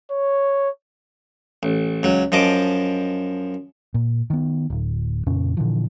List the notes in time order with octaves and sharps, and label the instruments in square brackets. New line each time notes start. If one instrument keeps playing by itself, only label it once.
[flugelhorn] C#5
[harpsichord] A1
C#2 F#3
F#2 F3 D#5 A5 D6
[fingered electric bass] A#2
D#3 B3
D1
F2 A#2 C#3 C#4
A#2 D3 E3 F3